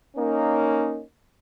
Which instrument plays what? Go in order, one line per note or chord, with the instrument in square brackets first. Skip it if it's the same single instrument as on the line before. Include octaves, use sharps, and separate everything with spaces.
[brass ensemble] A#3 C#4 D#4